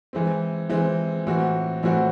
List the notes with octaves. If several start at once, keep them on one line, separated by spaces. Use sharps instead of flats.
E3 G#3 C4
E3 G#3 C4
A2 E3 C4 F#4
A2 E3 C4 F#4